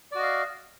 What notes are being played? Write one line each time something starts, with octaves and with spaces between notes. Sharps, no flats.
F#4 D5 D#5 F5